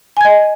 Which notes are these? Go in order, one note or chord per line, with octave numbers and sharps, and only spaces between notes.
D#5 G#5 G#6